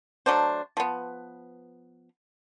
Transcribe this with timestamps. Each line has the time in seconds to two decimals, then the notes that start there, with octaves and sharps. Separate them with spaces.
0.26 F#3 A3 D4 C5
0.77 F3 B3